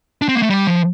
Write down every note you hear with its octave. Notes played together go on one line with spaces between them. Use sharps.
D4
C4
A#3
A3
G3
F3